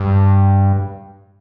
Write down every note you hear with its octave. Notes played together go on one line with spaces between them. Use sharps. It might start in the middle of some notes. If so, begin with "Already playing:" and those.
Already playing: G2